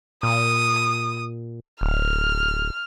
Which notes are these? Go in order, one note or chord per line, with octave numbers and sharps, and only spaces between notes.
A#2 D#6
D1 F6